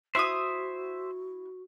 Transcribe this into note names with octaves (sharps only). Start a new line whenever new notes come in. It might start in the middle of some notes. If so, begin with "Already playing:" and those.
E4 F#4 C5 E5 C#6 D#6